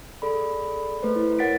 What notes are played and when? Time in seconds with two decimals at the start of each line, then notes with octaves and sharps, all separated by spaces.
0.22 G#4 A4 D5 B5
1.03 A3 B4 C5
1.16 E4
1.39 A#4 C#5 F#5 A6 B6 D7